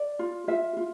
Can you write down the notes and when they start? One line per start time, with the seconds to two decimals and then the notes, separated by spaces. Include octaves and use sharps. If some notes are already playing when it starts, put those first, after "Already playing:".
Already playing: D5
0.19 F4
0.48 F4 E5
0.77 F4